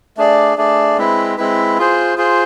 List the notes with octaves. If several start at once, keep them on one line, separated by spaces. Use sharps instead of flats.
A3 D4 G#4 D5
A3 D4 G#4 D5
G#3 C4 E4 B4
G#3 C4 E4 B4
F4 G#4 C5
F4 G#4 C5